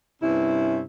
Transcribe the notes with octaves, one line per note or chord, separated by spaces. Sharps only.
G2 C3 C#4 E4